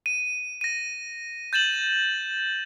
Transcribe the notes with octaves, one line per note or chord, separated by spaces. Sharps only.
D#7
A#6 D#7
G6 A6 E7 F#7